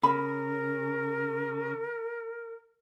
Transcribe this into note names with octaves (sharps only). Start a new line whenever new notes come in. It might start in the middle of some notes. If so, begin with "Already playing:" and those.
C#3 A#4 B5